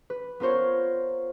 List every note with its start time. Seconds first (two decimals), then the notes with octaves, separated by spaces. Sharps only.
0.10 B4
0.40 B3 F4 A#4 C5 C#5